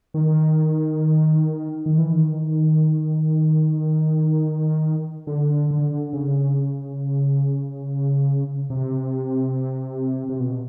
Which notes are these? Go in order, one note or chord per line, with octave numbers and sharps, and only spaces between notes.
D#3
D#3
E3
D#3
D3
D3
C#3
C3
C3
B2